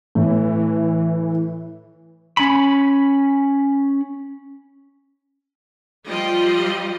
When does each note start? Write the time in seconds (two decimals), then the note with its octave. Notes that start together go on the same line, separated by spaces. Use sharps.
0.15 A2 E3
2.37 C#4 B5
6.07 F3 G3 F4 G4 D#5